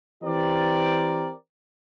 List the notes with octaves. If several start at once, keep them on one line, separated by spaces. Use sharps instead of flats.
E3 C4 G4 A#4 D5